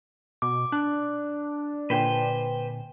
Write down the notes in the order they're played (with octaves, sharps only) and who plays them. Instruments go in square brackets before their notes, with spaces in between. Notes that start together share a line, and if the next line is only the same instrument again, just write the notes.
[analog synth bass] B2 [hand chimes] D6
[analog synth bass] D4 [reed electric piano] F#6
[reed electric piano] A#2 D3 G#5 [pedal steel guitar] B4 C5 G5